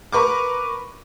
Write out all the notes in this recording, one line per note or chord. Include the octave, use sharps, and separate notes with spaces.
A#4 B4 C#6 D6